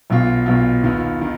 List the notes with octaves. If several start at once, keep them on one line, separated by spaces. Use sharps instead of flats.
B1 B2 B3 F4
B1 B2 B3 F4
D#2 D#3 B3 F4
D#3